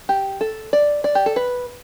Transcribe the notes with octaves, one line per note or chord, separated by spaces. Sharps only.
G4
A4
D5
D5
G4
A4
B4